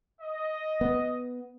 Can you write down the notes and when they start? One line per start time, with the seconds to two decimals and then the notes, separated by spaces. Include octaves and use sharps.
0.20 D#5
0.81 B3